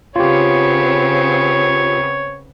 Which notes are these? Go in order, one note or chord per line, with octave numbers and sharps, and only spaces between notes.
C#3 B3 C4 F4 G4 C#5